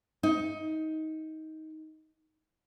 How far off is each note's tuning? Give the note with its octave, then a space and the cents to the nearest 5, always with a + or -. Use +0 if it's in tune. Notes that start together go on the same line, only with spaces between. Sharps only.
D#4 +20